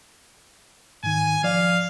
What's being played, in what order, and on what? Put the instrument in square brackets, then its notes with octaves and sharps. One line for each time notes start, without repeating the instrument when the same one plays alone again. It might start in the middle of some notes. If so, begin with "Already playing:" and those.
[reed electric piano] G#2 D#3 [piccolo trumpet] G#5
[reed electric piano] F3 D5 [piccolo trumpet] F5